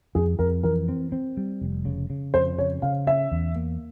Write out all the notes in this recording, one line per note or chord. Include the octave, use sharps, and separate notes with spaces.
F2 G#4
F2 A#4
E3 A#4
C4
C4
G3
F1
C#3
C#3
F2 C5
C#3 C#5
C#3 F5
C#4 E5
E2
A#3